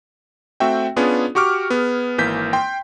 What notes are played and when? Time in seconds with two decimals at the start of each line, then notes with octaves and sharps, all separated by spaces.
0.60 A3 C4 F#4 E5 G5
0.96 B3 C#4 D4 F4 G#4
1.35 F#4 G4 C#6 D6 F6
1.70 B3 G#4
2.18 G#1 E3 A#3 G6 B6
2.53 G5 C6